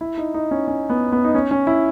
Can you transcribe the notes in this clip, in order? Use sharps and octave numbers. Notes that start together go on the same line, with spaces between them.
E4
D#4
D#4
C#4
C#4
B3
B3
D#4
C#4
C#4
E4